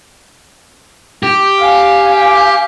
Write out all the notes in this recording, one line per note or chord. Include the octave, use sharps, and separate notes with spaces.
G4
F5 G#5